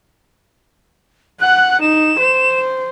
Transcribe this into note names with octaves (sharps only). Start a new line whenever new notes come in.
F#5 F#6
D#4 E7
C5